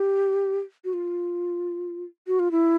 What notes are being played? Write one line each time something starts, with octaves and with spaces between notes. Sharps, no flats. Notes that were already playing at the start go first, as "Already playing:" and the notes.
Already playing: G4
F#4
F4
F#4
F4
E4